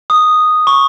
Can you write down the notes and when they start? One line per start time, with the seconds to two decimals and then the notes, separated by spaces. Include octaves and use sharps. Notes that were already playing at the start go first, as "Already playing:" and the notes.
0.10 D#6
0.67 C#6